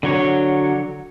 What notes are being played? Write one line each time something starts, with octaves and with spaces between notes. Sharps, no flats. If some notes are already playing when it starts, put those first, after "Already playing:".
D3 F#3 C#5